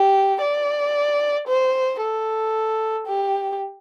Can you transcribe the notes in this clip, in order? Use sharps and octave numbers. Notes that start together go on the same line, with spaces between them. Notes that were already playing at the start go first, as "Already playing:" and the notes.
Already playing: G4
D5
C5
A4
G4